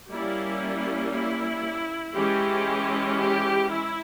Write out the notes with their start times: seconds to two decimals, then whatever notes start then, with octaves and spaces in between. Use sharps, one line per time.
0.10 G3 A#3 C#4 E4
1.12 E4
2.14 E3 G#3 C#4 G4
3.17 G4
3.69 E4